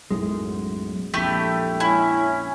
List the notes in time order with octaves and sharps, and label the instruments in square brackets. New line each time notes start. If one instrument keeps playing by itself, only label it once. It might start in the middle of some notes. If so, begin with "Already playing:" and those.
[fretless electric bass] B1 F#2 A2 [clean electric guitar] G#3
[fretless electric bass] A#1 F2 [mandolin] A3 E4 G4
[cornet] C#4 [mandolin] E4